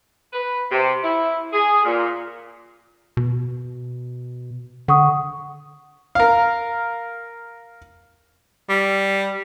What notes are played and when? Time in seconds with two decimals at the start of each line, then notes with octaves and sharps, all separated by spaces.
0.33 B4
0.71 C3
1.03 E4
1.53 G#4
1.85 A#2
3.17 B2
4.88 D3 F#5 C#6 D#6
6.15 A#4 F5
8.69 G3